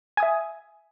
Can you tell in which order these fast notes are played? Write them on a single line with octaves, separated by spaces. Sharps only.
G#5 D#6 E5